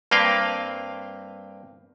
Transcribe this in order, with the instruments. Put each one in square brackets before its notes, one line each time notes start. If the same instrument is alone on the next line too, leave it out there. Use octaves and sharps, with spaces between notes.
[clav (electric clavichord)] G2 A#3 C4 B4 F5 G5